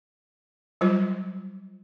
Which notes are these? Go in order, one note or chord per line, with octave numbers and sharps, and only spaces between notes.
F#3 G3 F4 C5